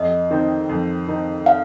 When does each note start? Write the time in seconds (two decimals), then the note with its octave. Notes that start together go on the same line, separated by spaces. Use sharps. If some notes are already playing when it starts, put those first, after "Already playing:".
Already playing: F2 D#5
0.31 D#3 C4 D#4
0.69 F2
1.08 D#3 C4 D#4
1.46 F5